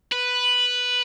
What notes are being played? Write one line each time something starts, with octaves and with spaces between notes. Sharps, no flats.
B4